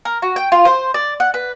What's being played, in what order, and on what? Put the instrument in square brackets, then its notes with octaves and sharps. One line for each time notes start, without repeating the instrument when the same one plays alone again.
[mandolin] A#4
F#4
G5
F4
C5
D5
F#5
B4